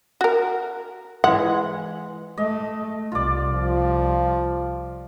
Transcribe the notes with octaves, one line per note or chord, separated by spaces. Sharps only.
F#4 A#4
E3 G#3 F#5
A3 D#5
C2 F4 D5
F3